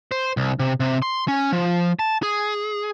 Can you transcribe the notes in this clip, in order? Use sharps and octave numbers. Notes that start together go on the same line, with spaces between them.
C5
C2
C3
C3
C6
C#4
F3
A5
G#4